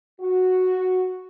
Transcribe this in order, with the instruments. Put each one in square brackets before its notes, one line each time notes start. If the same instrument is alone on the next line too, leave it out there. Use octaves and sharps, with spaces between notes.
[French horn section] F#4